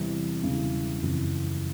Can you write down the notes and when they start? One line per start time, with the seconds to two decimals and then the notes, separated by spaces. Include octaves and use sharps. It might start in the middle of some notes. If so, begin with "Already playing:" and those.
Already playing: E2 C3 E3 G3 C4
0.43 E1 E2 C#3 E3 G3
1.02 F#1 F2 C#3 E3